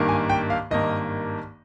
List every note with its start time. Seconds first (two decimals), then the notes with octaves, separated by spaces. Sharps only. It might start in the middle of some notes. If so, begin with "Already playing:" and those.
Already playing: G#1 G2 D#3 A#3
0.09 G#5
0.29 G5
0.50 F5
0.71 G#1 G2 D#3 A#3 D#5